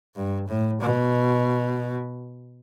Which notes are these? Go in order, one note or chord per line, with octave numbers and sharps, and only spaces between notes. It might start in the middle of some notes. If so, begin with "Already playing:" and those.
G2
A2
B2